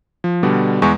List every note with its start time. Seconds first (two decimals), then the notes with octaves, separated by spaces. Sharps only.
0.24 F3
0.43 B2 D3 G3
0.82 E2 G#3 C#6